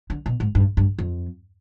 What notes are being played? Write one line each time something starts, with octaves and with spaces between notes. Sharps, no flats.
D3
B2
G#2
G2
G2
F2